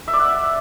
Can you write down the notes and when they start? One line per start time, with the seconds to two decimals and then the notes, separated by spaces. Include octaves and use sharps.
0.08 E5
0.13 D5
0.19 F#5